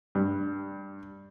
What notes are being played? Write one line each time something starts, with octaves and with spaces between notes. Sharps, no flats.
G2